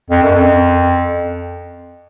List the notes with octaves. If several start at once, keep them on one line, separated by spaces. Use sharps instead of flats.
F2
F#2
F2